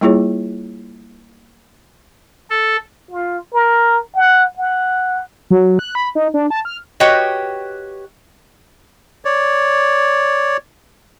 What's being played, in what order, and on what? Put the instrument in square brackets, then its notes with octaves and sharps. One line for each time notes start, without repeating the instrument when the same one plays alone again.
[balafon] G3 A#3 E4 F4 G#4 C#5
[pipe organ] A4
[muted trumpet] F4
A#4
F#5
F#5
[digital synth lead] F#3
F#6
B5
D#4
D4
A5
F6
[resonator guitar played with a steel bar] F#4 G4 B4 C#5 D#5 G5
[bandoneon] C#5 D5